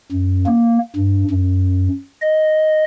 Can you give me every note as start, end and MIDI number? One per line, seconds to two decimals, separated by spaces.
0.12 0.46 42
0.46 0.78 58
0.96 1.24 43
1.31 1.89 42
2.21 2.84 75